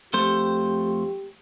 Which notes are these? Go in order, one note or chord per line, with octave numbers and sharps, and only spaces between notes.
F2 A3 G4 C5